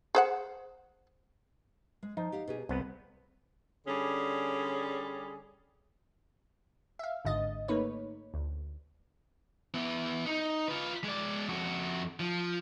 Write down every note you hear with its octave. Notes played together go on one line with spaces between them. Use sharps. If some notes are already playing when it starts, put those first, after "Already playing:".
G#4 C5 F#5
G#3
F3 D#4
G4 F5 F#5
B2 G4 G#4
C2 B3 C4 B4
D3 G3 C#4 G#4
E5 F5
G#1 G#2 D3 D#5 A6
A3 A#3 D#4 B4 C#5
D2
B3 E4
D#4
F4 B4
G#3 D5
F2 F#4
F3